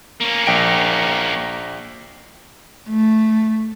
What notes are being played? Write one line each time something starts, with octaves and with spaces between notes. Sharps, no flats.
A#3 C#4
A#1 G5 D7
A3